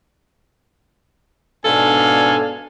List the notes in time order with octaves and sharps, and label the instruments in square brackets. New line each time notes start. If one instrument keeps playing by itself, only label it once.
[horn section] G#2 B2 D4 A4 F5 G#5